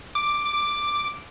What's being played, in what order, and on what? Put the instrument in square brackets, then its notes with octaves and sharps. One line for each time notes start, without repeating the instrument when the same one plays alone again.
[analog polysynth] D6